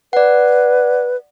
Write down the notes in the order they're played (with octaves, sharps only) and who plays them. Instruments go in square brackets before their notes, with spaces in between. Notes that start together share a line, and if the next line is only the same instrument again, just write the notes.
[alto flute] B4 [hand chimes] D5 F#5